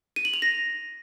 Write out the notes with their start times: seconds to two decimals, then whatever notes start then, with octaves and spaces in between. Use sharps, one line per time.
0.16 D#7
0.25 F#7
0.34 F7
0.42 A#6